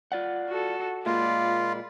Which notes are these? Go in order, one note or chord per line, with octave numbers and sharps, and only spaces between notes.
F4 D5 F#5
F#4 A4
A#2 G#3 A#3 F4 D5 B5